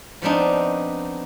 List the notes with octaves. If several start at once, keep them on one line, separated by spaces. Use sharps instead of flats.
F3 B3 C4 D4 D#4